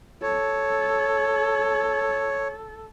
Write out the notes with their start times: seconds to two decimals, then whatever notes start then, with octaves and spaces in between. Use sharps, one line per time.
0.22 A4 C#5